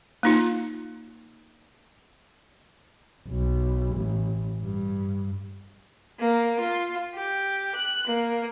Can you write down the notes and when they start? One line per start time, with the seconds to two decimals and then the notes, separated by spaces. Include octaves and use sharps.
0.23 A#3 D#4 F4
3.27 B1
3.96 A1
4.61 G2
6.20 A#3
6.60 F4
7.14 G4
7.75 F#6
8.07 A#3